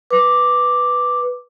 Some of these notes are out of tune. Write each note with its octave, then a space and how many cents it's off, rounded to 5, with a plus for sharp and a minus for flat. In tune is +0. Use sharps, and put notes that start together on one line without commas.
B4 +0 D6 +0